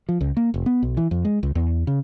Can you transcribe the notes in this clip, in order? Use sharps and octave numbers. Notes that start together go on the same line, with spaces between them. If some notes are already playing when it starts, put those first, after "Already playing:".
F3
C#2
A#3
F1
B3
B1
E3
F2
G#3
C#2
E2
C#3